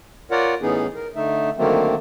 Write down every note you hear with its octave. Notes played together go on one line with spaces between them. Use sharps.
F4 A#4 C#5 D5 F#5
A2 E3 B3 C#4 D#4 G#4
A#4
D3 A3 D#4 E5
D3 D#3 F#3 A3 A#3 C4